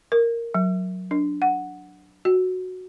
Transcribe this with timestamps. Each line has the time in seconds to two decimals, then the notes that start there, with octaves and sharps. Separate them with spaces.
0.12 A#4
0.54 F#3
1.11 D4
1.42 F#5
2.25 F#4